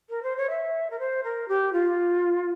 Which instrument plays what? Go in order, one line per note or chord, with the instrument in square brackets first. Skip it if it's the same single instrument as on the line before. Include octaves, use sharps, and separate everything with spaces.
[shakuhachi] A#4
C5
C#5
E5
A#4
C5
A#4
G4
F4